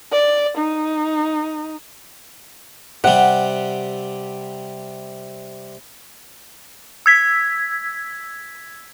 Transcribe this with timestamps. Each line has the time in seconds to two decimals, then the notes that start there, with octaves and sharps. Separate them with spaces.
0.12 D5
0.58 D#4
3.04 C3 G3 F#5
7.06 E6 G#6 B6